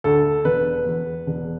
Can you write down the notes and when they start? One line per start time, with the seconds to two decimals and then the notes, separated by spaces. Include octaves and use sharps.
0.04 D2 A4
0.45 E1 B4
0.86 E2
1.27 E1